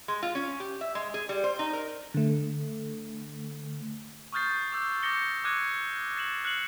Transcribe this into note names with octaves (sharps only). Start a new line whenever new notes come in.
G#3
F4
C#4
G4
E5
G#3
G#4
G3
C5
D#4
A#4
D3 A3
C#6 D#6 F6 G6 A6 C7
D6 E6 G6
D6 G6 A6 A#6 C#7 G7
D6 E6 F#6 G#6 D#7
A6 C7 E7 F#7
F6 F#6 C7 C#7 E7 F#7